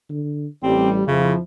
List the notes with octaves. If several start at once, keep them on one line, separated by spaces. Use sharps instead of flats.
D3
A1 G3 C4
F2 C#3 F3 E4